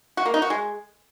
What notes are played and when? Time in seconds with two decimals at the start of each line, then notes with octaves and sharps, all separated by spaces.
0.17 F#4
0.26 A#3
0.34 D#4
0.42 F#4
0.50 G#3